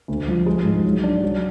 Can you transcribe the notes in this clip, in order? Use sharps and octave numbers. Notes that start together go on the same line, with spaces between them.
D2
F3
G#3
G#2
F#3
D4
F#3